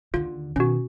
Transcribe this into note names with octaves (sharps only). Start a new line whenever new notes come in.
D#2 D3 F4
B2 D#3 C#4 F#4